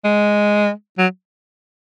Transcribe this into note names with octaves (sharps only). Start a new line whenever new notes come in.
G#3
F#3